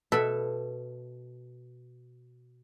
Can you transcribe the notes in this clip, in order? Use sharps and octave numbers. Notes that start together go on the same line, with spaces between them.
B2 A4 E5 B5